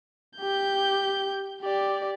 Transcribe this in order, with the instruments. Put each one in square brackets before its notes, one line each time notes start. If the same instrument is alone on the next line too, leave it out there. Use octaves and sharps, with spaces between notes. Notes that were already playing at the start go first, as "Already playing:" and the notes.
[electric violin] G4 G6
G4 D5